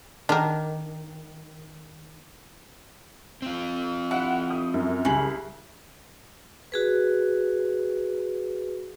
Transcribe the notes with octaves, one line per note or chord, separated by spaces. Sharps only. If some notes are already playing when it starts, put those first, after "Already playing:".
D#3 D4 A#4
C4 F4
E4 F#5
D#6
F#2
C2 C#3 F#7
F#4 G#4 B4